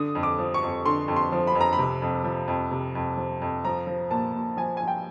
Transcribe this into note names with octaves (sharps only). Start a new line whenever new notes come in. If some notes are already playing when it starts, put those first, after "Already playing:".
Already playing: D3 D#6
F2
D6
F3
C#6
F2
D3 C6
F2
C6
F3
B5
F2
A#5
B5
C3
F2
F3
F2
C3
F2
F3
F2
F3 A#5
F3
A#2 A5
A#2
F3 G#5
F3 G#5
G5